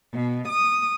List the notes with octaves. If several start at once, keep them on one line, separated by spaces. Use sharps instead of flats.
B2
D#6